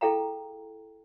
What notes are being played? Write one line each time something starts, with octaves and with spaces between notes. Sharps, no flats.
E4 G#4 A4 F5 G5 A#5